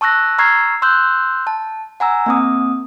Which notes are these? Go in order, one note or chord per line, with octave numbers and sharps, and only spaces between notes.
A5 C#6 E6 F#6 A#6
A#5 C#6 E6 F6 G#6 C7
C6 E6 F#6 G6
A5
F#5 G#5 A#5 E6
A#3 C4 D#6